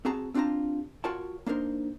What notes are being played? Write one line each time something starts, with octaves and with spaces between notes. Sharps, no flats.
C4 F#4 G#4 A5 A#5
C4 D4 F4 G4 A5 A#5
F4 F#4 A#4 C#5 G5 A5
A#3 D4 D#4 A#4 C5